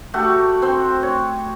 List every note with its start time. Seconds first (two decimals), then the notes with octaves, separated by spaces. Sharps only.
0.14 A3 F#4 G4
0.62 C4 C5
1.03 C#5